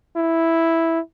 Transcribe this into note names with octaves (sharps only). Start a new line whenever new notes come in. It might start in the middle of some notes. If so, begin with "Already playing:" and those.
E4